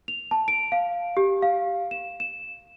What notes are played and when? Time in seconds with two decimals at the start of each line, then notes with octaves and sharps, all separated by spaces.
0.08 F7
0.31 A5
0.48 D7
0.72 F5
1.17 G4
1.42 F5
1.91 E7
2.20 E7